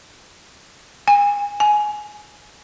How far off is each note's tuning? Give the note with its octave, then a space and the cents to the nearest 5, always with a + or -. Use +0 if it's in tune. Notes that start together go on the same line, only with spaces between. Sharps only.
G#5 -25
G#5 +15